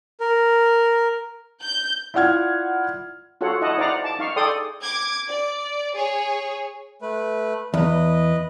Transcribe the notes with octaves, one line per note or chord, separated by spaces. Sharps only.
A#4
G6
E4 F4 D5 F#5 F6 G#6
F4 F#4 A4 C#5 F#5
E4 D#5 F#5 A5
D#4 C5 D5 F5 F#5 A#5
A5 D6
D#4 F5 C#6
G#4 A4 D5 G5 C6 D#6
D6 G#6
D5
G#4 C#5
A3 B4
E2 B4 D#5